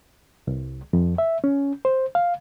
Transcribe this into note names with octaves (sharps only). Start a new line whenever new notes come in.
C2
F2
E5
C#4
C5
F5